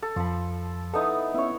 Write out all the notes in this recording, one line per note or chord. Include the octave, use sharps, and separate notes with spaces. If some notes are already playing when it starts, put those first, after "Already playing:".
A4
F2 F3 B5
B3 D#4 E4 A4
B3 C#4 E4 C#5